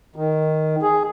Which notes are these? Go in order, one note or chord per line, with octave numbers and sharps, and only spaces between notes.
D#3
G#4